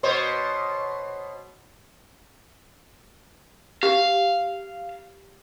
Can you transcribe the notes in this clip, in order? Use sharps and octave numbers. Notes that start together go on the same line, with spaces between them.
B2 C5 C#5
G4 F5